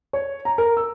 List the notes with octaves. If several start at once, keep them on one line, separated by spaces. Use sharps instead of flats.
C#5
A#5
A#4
E6